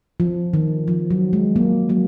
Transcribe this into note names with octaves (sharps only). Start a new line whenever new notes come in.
F3
D#3
F3
F#3
G#3
F#3 A#3
F#3 A#3